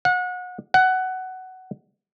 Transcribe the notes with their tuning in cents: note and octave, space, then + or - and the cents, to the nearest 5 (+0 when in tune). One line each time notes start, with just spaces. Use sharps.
F#5 -30
F#5 +15